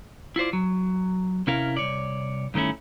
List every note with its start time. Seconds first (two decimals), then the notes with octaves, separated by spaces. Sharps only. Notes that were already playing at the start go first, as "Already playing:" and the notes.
0.36 E4 F4 C5 D5
0.53 F#3
1.47 C3 C#4 E4 A#4 F5
1.77 C2 C#5 D5
2.54 G2 D#3 A3 C#4 E4